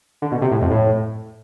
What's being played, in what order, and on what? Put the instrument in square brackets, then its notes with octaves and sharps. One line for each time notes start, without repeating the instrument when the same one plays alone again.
[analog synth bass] D3
B2
C3
A2
F2
A2